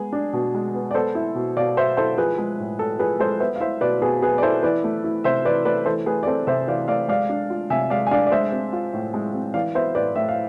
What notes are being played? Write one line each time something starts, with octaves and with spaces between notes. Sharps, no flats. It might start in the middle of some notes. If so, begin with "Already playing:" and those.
Already playing: G#3 B3 G#4
D4
B2
G#3
B3
D5
B3 A4 C5
E4
B2
B2 D5 F5
B3 C5 E5
E4 A4 C5
F3 G#4 B4
G#3
A2
A2 A4
F3 G#4 B4
G#3 A4 C5
B3 C5 E5
F5
E4 C5 E5
B2 B4 D5
B2 G#4 B4
B3 G#4 B4
D5
E4 A4 C5
E3 B4 D5
A3
E4
C3 C5 E5
E3 B4 D5
A3 B4 D5
E3 A4 C5
A3 G#4 B4
D5
C4 A4 C5
C3 C5 E5
E3 D5 F5
A3 D5 F5
G#3 D5 F5
D4
F4
C3 E5 G#5
G#3 D5 F5
G#5
D4 D5 F5
D5
G#3 C5 E5
C4
F4
A2
G#3
C4
E3 D5 F5
B3 C5 E5
A2 B4 D5
A2 E5
F5